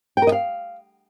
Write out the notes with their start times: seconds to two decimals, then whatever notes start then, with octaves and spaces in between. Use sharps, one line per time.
0.17 G5
0.22 A#4
0.27 D#5
0.32 F5